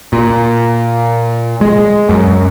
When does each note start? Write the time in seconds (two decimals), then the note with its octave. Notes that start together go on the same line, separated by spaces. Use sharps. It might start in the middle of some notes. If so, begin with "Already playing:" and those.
0.13 A#2
1.61 G#3
2.09 F#2